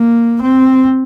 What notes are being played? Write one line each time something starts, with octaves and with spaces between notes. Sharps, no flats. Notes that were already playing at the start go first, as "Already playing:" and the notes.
Already playing: A#3
C4